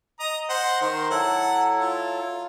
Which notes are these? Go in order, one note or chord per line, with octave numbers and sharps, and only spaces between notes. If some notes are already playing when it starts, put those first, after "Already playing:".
D#5 A#5 D#6
C5 F#5
D#3 A#4 C5
F#3 E4 A4 F#5
F4